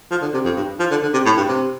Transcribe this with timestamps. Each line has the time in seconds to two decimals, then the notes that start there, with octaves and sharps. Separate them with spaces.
0.11 F3
0.22 D3
0.34 C3
0.45 F2
0.57 G2
0.80 F3
0.91 D3
1.02 D3
1.13 C3
1.25 A2
1.37 G2
1.48 C3